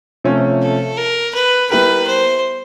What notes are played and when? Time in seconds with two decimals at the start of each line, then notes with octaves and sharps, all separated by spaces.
0.24 C3 F3 A3 C#4
0.62 A4
0.97 A#4
1.34 B4
1.70 G3 B3 E4 G4 A#4 B4
2.07 C5